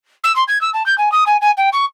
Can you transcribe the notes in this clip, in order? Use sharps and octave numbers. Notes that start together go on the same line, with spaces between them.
E6
C6
G#6
E6
A5
G6
G#5
D#6
G#5
G#5
G5
C#6